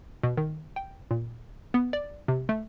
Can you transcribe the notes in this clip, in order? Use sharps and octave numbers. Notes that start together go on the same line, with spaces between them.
B2
D#3
G5
A#2
B3
D5
C3
A3